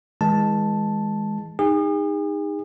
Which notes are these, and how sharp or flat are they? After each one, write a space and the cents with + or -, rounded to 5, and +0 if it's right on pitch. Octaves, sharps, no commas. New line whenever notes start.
E3 -35 G#3 +0 A5 +0
D#4 +0 G#4 -40